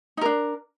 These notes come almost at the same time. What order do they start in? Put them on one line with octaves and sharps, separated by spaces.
D#4 A#4 D4